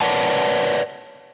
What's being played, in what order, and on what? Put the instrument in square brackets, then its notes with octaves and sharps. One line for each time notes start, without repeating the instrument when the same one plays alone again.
[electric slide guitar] A#4 B4 C#5 D5 F#5 A5